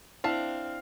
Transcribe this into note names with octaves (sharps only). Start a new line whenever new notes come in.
C4 D4 E4 E5 F5 A5